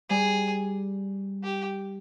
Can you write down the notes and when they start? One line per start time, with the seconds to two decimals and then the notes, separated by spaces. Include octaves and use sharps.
0.09 G3 G#4
1.44 G4